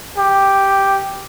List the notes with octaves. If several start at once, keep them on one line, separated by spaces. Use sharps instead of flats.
G4